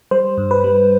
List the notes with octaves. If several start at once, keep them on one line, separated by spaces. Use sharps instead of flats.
G3 C5
G2
B4
G3